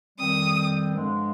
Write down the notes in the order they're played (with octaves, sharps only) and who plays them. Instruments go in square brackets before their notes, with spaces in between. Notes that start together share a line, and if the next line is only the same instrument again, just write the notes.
[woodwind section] F2 D#3 G3 C4 [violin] D#6
[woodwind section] G2 D3 F3 G#3